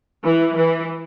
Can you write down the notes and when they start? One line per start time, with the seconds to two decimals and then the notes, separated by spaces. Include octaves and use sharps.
0.24 E3
0.56 E3